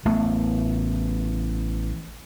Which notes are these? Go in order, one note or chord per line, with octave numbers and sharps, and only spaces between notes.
A1 A3 B3